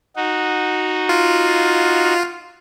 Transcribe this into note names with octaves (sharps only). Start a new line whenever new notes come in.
D#4 F#4
F4